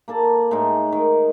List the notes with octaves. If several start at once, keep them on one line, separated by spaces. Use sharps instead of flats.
A#3 A4 D5
A2 G#3 D#4
D#3